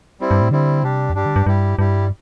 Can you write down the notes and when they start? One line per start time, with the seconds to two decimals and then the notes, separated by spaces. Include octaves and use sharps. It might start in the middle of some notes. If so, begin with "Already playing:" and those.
0.20 G3 C4 E4
0.31 G2
0.41 A2
0.51 D3 G3 C4 E4
0.83 C3 G3 D4 G4
1.10 E2
1.14 G2 G3 D4 G4
1.26 D3
1.36 G2
1.46 G2 G3 E4 G4
1.78 G2 G3 E4 G4